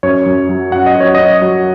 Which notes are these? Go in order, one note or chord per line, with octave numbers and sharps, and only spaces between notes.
F#2 C#5
F#2
F#3
F#2 F#5
D#5
F#2
C#5
F#2 D#5
F#3 C#5